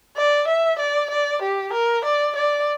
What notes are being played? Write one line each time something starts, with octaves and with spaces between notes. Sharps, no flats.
D5
E5
D5
D5
G4
A#4
D5
D5